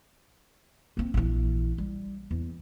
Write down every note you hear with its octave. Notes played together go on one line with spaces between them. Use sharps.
A#3 C4
A#1 E3
G3
E2